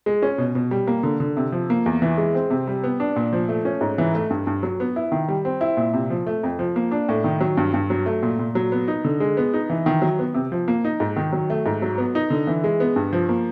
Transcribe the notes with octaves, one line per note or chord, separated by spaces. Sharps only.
G#3
C#4
B2
B2
G3
A#3
D3
D3
C3
F3
A#3
E2
E3
G#3
C4
C3
G3
B3
D4
A#2
F3
A3
C#4
G#2
E3
A3
G2
G2
F#3
B3
E4
D#3
G3
C4
E4
A#2
C3
F3
A3
F2
F3
A#3
D4
A2
D#3
F#3
G2
G2
F#3
A3
A#2
A#2
F#3
B3
D#4
D3
G#3
B3
D#4
E3
D#3
F#3
B3
C3
F3
A#3
D#4
G#2
D#3
F#3
A3
G#2
F#3
B3
D#4
D3
E3
G#3
B3
G2
F3
A#3